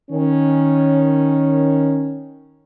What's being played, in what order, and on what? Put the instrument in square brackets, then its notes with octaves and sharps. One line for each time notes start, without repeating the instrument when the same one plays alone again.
[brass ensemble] D#3 C#4